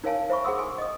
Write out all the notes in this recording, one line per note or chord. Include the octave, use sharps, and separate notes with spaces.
D#4 A#4 C#5 F5 G#5 A5
C5 E5 B5 C#6
G#4 C5 F#5 C6 D#6 E6
G#5 C6
D#5 D#6